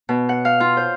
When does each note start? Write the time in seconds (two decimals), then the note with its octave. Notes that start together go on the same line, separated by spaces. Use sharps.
0.09 B2
0.29 F#5
0.45 F5
0.60 F4
0.77 C5